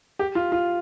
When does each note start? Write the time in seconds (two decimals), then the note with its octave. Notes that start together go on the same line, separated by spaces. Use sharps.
0.19 G4
0.35 F4
0.52 F4